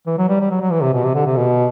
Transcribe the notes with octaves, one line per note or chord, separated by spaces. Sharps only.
E3
F#3
G3
G3
F#3
F#3
E3
C3
B2
C3
D3
C3
B2